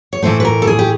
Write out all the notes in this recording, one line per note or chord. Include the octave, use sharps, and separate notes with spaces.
C#5
A2 E3 A3 C5
B4
A#4
A4
G#4
G4